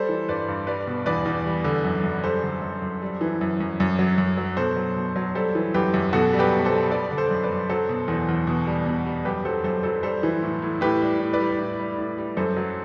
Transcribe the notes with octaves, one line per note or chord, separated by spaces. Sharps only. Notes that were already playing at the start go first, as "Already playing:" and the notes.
Already playing: G3 A4 C5
E3
G2 B4 D5
G2
G3 B4 D5
B2
E2 B4 D5
E2
G3
D3
F#2
F#2
G3 A4 C5
D3
F#2
F#2
G3
E3
F#2
F#2
F#2
F#3
F#2
F#3
B2 A4 C5
F#3
B2
F#3
G3 A4 C5
E3
F#2 G4 B4
F#2
B2 F#4 A4
G3
G4 B4
B2
A4 C5
G3
G3 B4 D5
D3
A4 C5
F#2
B4 D5
F#2
F#3 A4 C5
B2
E2
E2
B2
G3
B2
G3
F#2 G4 B4
F#3 A4 C5
F#2 A4 C5
F#3 A4 C5
G3 A4 C5
E3
A2
A2
A2 G4 B4
G3
A2
B4 D5
G3
A2
G3
A2
G3
F#2 A4 C5
F#3